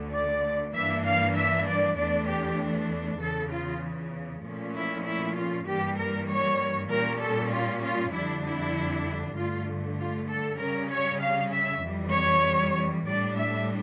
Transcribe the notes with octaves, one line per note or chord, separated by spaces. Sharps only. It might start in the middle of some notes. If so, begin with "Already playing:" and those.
Already playing: D2 D3 A3
D5
G2 E3 A#3 D4 E5
F5
E5
D5
E2 E3 A3 D4 D5
G4
E2 C#3 E3 A4
F4
A#2 F3 A3 C#4
E4
E4
F4
G2 E3 G3 A#3 G4
A#4
C#5
A#2 G3 C#4 A#4
A4
F4
F4
F2 D3 G3 D4 E4
E4
G2 D3 A3 F4
F4
A4
C#3 G3 C#4 A#4
C#5
F5
E5
F2 E3 G3
C#5
A2 G3 D4 D5
E5